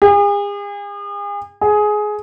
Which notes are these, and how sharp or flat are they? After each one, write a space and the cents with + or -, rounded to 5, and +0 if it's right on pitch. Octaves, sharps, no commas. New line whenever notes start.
G#4 -40
G#4 +15